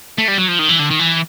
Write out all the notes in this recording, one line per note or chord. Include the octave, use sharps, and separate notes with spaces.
A3
G3
F#3
F3
D#3
E3
D3
D#3
E3